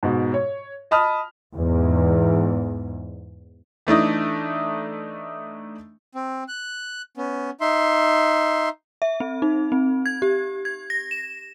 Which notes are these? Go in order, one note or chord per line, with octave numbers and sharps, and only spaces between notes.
G#2 B2
C#5
D#5 A5 B5 D#6 F6
E2 G#2
E3 A3 D4 D#4
C4
F#6
B3 C#4
D#4 E5 C6
E5
C4
D#4
C4
G#6
G4
G#6
A#6
E7